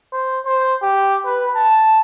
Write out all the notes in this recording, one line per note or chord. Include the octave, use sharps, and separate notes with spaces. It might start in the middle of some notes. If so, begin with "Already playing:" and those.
C5
C5
G4
B4
A5